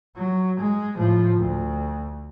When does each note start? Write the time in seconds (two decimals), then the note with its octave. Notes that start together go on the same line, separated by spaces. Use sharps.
0.16 F#3
0.59 G#3
0.97 A2 F3
1.37 D2